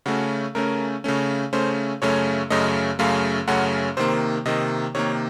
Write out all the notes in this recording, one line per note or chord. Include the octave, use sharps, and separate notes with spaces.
C#3 A3 C#4 F#4
C#3 A3 C#4 A#4
C#3 A3 C#4
C#3 A3 C#4 C5
F#2 C#3 A3 C#4 C#5
F#2 C#3 A3 C#4 D#5
F#2 C#3 A3 C#4 F5
F#2 C#3 A3 C#4 F#5
C3 D#3 A#3 C5
C3 D#3 A#3 D#5
C3 D#3 A#3 C#5